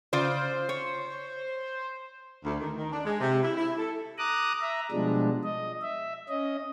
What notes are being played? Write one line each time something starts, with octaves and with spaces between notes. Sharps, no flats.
C#3 F4 C5 D5
C#5
D2
D#3
D#3
D4
G#3
C3
E4
E4
A4
A#5 D6 D#6 F#6
E5 A#5
B2 F3 G3 G#3 D4
D#5
E5
C#4 D#5